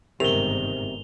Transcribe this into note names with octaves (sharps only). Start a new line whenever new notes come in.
G1 G#2 C3 D#3 G4 A#4 F7 G7